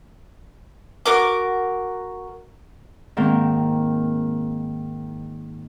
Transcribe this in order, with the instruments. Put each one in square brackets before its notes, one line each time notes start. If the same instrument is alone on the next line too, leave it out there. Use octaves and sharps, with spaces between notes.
[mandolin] F#4 A#4 D6
[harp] G#2 D#3 A#3 C4